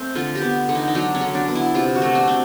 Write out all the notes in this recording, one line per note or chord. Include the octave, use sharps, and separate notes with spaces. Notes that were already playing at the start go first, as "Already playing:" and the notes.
Already playing: A3 C4
D3 F4
G4
B3
D3
D#4
D#4
F#3 D4
C#4
D3
D4
B3
E4
C3 F4
F#4
A3
D4
C4